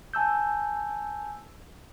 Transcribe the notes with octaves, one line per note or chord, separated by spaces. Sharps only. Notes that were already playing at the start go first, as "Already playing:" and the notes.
G#5 A5 E6 G6